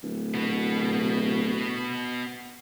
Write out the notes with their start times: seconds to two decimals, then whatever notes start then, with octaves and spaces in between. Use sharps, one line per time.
0.03 D1
0.34 B3 F#4